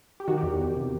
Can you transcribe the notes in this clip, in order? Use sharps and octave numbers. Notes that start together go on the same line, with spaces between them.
G4
D#3 F#4
G4
E2
E2
C3